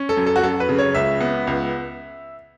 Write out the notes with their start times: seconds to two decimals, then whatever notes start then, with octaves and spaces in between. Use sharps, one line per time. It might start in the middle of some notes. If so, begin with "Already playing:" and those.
Already playing: C#4
0.09 A4
0.17 F#2
0.26 A4
0.36 F#4
0.43 F#2 A4
0.60 B4
0.69 C#3
0.78 C#5
0.94 C#2 E5
1.21 B3
1.47 C#2